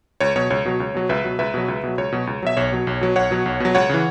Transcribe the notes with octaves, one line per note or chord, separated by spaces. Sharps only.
C#2 C#5
B2 F#3 C#5
C#2 C#5
B2 F#3
C#2
B2 F#3
C#2 B4 E5
B2 F#3
C#2 B4 E5
B2 F#3
C#2
B2 F#3
C#2 C#5
B2 F#3
C#2
B2 F#3 E5
B1 C#5
B2 F#3
B1
B2 F#3
B1 C#5 F#5
B2 F#3
B1
B2 F#3
C#2 C#5 F#5
C#3 E3